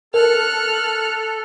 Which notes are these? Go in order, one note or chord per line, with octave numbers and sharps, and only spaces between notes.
A4 A#4 F6 F#6